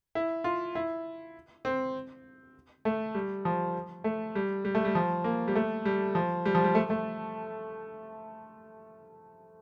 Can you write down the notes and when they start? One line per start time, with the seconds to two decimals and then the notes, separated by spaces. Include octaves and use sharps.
0.15 E4
0.44 F4
0.75 E4
1.65 C4
2.85 A3
3.15 G3
3.45 F3
4.04 A3
4.35 G3
4.65 G3
4.75 A3
4.85 G3
4.95 F3
5.24 A#3
5.48 G3
5.55 A3
5.85 G3
6.15 F3
6.45 G3
6.55 F3
6.64 G3
6.75 A3
6.90 A3